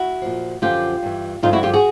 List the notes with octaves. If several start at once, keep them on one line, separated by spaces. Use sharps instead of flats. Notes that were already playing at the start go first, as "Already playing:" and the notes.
Already playing: E4 F#4
A#2 F3
F#2 D3 F3 F4 G4
G2 E3
G2 D3 F3 D#4 F4
E4 F#4
F4 G4
F#4 G#4